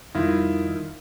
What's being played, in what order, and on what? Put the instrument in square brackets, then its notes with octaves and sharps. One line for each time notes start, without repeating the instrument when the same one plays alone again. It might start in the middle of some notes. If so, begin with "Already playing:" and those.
[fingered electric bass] F2 G3 [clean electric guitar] D#3 [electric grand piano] E4 F4